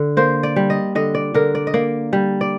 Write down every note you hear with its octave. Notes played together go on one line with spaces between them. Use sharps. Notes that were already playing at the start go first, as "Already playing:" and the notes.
Already playing: D3
A#3 C5
D5
G3
D#5
D3 D#5
D5
D3 A#4
D5
D#5
A#3 D5
G3
D5